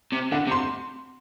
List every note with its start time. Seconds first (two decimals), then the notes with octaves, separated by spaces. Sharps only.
0.12 C3
0.32 D3 F#5
0.47 C3
0.51 C6